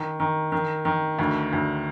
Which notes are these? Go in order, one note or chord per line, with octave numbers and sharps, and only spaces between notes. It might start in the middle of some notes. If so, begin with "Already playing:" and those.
Already playing: D#3
D#3
D#3
D#3
D2
D2